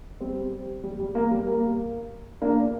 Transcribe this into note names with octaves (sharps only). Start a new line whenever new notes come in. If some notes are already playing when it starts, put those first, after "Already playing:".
G3 C4
G3
G3
A#3
G3
A#3
A#3 D4